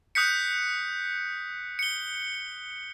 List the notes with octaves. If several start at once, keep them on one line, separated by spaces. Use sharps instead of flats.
D#6 F#6 G6 B6 C#7
C#7 G7